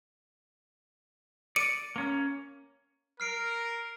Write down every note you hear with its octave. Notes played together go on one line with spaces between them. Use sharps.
D5 C#7 D#7
A#3 C#4
A#4 F6 C7 D7